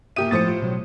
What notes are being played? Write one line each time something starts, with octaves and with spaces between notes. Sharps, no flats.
A#2 G4 E5 D#6 D#7
A2 F3 C5 D#6 A6 C#7
F4
B2 F#3